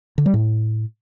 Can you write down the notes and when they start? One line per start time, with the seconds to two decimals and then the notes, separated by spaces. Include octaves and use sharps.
0.18 D3
0.26 G3
0.34 A2